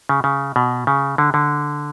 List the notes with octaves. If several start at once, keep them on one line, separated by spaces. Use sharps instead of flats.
C#3
C#3
B2
C#3
D3
D3